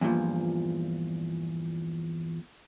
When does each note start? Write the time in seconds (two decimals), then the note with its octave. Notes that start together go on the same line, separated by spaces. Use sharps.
0.01 E2 G2 A#2 F3